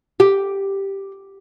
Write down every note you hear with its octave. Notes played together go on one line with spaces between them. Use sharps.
G4